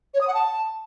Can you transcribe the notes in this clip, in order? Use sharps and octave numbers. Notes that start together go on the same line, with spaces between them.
C#5
D#6
F#5
A5